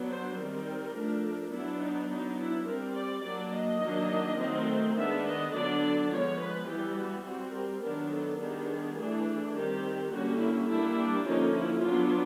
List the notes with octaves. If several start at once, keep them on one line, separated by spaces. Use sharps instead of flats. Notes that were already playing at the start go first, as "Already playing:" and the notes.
Already playing: F#3 B3 D4
C5
D#3 G3 C4 A#4
F3 A3 D4
F#3 B3 D4 E4
D#4
F#3 B3 D4 D#4
E4
G3 C4 A#4
D5
F#3 A#3 D4 D5
D#5
D#3 F#3 A#3 D4
D#3 F#3 A3 C4
D#3 G#3 B3 D4 E5
D#5
D3 F#3 B3 D4 D5
F3 G#3 B3 C#5
B4
E3 G3 B3 G4
F#4
G3 C4 F#4
A#4
D#3 F#3 B3 D4 A#4
A4
D#3 G3 B3 D4 G#4
E3 A3 D4
D#3 G3 C4 G4
D3 G3 A#3 C#4 F#4
E4
G3 A#3 D4 E4
D4
D3 F3 A#3 C#4 D#4
E4
F#3 B3 D4 F4